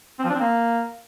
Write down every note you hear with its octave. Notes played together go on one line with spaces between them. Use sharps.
C4
F3
D4
C4
A#3